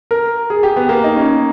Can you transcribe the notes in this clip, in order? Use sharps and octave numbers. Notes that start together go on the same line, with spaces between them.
A#4
G#4
G4
B3
A#3
D#4
C#4